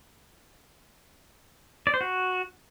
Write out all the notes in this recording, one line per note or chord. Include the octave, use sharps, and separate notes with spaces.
D5
C5
F#4